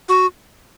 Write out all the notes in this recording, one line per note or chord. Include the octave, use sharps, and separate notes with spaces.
F#4